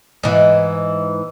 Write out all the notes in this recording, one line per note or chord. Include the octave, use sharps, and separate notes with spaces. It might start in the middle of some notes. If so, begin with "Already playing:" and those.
G#2 E3